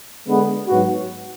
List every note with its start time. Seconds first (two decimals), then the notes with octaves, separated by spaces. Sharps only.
0.27 D3 G#3 B3
0.68 G#2 F#3 B3 F#4